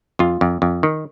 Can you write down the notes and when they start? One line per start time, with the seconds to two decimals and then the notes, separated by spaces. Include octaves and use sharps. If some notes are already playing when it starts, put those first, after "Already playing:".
0.19 F2 F4
0.41 F2
0.62 F2
0.83 D#3